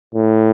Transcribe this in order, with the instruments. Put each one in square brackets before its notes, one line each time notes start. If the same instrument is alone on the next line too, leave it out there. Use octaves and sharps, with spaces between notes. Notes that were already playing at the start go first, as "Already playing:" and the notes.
[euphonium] A2